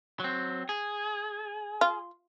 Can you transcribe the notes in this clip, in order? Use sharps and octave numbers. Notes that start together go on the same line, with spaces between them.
F#3 C4
G#4
F4